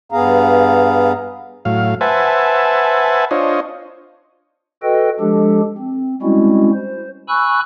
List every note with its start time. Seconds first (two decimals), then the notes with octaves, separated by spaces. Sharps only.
0.12 G2 B3 G#4 F5 A#5
1.65 A2 F#3 F5
2.01 B4 C5 E5 F#5 G#5 A5
3.31 D4 F4 C5 C#5 D#5
4.83 F#4 A4 B4 D#5 G5
5.20 F3 G#3 D4 G4 A4
5.78 C4
6.22 G3 G#3 C4 C#4 E4 F#4
6.74 C5
7.28 G#5 B5 C#6 E6 F#6